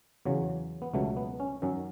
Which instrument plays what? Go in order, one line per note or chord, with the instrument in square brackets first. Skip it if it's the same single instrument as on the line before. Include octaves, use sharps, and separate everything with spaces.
[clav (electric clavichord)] E2 C#3 F#3
B3
C#2 B2 F#3 A3
B3
C#4
F#2 D#3 F#3 C#4